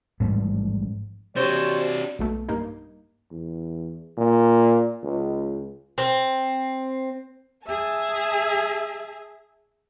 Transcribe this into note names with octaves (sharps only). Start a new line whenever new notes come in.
A1 G#2 F3 G3
C3 D4 F#4 G4 C5 C#5
B1 B2 A3
G2 A#3 D#4
E2
A#2
C#2
C4
G#4 E5 G#5 A5